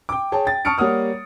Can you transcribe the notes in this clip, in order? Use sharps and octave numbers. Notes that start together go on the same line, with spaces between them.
G5 D6
G#4 C#5 G5 A5
G5 A6
A5 C#6 D#6 F6 C#7 D7
G3 A#3 C#5 F#5 D#6 F6